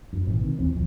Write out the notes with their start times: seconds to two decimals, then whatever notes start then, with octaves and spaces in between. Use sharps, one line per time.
0.13 F#2
0.27 G#1 A#2 E3
0.41 C3 D#3
0.59 D#2 E3 C4
0.73 A#1 D#2 F3